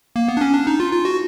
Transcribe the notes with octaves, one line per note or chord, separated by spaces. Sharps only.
A#3
B3
D4
C#4
D4
D#4
F4
F4
F#4